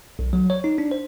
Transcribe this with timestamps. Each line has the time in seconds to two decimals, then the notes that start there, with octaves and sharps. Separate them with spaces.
0.19 B1
0.33 F#3
0.50 C#5
0.64 D#4
0.78 D4
0.91 C5